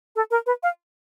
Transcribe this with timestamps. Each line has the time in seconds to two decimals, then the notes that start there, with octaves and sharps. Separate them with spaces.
0.16 A4
0.31 A#4
0.46 B4
0.63 F5